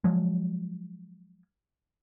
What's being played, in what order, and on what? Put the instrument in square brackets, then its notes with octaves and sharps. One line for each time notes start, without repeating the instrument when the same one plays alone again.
[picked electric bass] F3 F#3 G#3